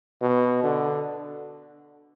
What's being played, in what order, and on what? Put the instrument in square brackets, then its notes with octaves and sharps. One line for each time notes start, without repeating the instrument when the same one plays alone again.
[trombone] B2
D3